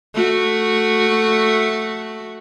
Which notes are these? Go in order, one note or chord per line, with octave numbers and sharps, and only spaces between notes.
A3 F#4